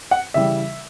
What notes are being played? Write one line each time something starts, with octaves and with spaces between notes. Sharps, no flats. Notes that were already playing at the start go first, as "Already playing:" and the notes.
F#5
C#3 E3 G3 E5